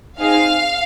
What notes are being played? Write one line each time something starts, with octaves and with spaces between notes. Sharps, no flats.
C4 D#4 G#4 F5